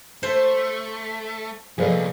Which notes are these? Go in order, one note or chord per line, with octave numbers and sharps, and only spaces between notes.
A3 C5
C2 A#2 F3 G#4 A4 B4 D5 D#5